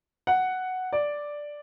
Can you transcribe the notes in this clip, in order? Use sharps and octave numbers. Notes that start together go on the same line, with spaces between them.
F#5
D5